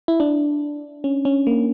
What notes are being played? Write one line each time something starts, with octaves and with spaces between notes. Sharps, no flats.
E4
D4
C#4
C#4
A#3